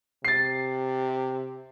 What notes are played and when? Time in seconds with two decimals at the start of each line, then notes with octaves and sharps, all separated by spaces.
0.25 C3 A6 C7